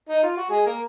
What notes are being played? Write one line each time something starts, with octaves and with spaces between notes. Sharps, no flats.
D#4
F4
F#4
G#3 G#4
A#3 A#4